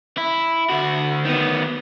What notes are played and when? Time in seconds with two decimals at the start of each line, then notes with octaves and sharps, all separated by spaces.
0.17 E4
0.69 D2 F#4
1.25 D#3 B3